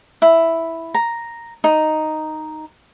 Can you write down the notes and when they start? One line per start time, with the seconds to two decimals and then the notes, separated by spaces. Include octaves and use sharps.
0.22 E4
0.94 A#5
1.64 D#4